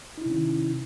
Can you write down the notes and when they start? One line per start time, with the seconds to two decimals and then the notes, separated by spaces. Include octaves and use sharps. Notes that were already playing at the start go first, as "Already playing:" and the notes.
0.18 D#4
0.22 E4
0.26 C3
0.30 C#4
0.34 D#3